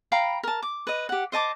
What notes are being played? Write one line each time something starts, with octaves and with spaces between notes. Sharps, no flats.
F5 G5 A#5 B5
A#4 A5
D6
B4 D#5
G4 F#5
C5 D#5 A5 D6